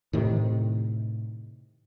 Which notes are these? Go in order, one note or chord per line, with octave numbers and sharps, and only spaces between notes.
A2 C3 D#3